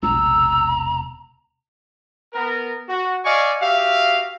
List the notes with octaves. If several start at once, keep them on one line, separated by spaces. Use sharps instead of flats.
E1 A#1 C3 A#5 E6
B3 A#4
F#4
D5 D#5 F5 G#5 C#6
F#4 G4 E5 F5